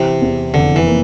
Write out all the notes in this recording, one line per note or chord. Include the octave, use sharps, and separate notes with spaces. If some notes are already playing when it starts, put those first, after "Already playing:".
Already playing: C3 E3
E2
F1 D3
E3
A#3